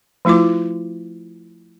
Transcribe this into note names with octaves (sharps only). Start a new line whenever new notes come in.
F3 A3 E4 F4 D6